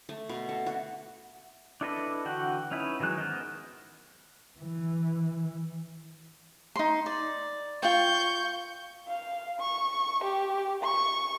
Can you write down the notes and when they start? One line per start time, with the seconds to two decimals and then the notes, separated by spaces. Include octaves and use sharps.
0.09 A3
0.29 B2
0.49 A4
0.66 F#4
1.81 D4 E4 A4 B4 D#5
2.25 D3 E3 F#4 F#5 G5
2.71 C#4 D#4 E4 B4
3.00 D#3 E3 F#3 G#3 F#6
3.18 B3 A#4 C5 D#5
4.60 E3
6.76 D#4 C6
7.06 D5
7.83 F4 G5 C#6 G6
9.08 F5
9.61 C#6
10.24 G4
10.83 C#6